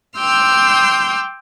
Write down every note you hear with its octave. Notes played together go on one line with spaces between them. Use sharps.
G5 C6 D6 E6 F6 G6